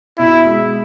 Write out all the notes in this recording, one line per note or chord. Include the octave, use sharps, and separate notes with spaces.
B2 E4
G#3